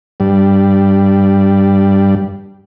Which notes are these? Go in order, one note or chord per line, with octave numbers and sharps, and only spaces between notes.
G2 G3